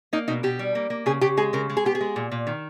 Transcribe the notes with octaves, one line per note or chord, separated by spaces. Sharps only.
A#3 D#4
B2 D#4
B2 G4
G3
A#3
A#3
C#3 G#4
C#3 G4
G#3 G#4
C#3 A#4
G#3
G#4
B3 G4
G#4
G#3
A#2
A#2
D#3